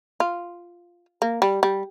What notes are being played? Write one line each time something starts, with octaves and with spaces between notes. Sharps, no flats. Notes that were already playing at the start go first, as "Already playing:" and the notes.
F4
A#3
G3
G3